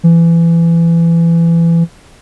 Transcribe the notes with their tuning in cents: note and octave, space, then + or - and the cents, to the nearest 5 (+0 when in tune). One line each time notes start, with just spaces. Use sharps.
E3 +25